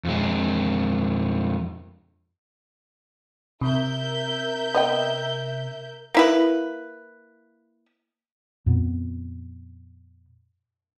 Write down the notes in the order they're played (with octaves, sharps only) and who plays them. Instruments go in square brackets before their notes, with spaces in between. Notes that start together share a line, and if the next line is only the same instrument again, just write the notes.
[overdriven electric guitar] F2 G#3
[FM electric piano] C3 [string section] A#4 E5 G6
[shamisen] B3 D#5 G5
[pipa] A#3 E4 B4
[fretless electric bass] F2 A#2 B3